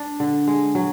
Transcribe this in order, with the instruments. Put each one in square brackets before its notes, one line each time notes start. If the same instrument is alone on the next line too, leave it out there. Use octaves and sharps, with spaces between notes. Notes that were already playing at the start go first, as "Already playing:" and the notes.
Already playing: [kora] D4
D3
G#3
F#3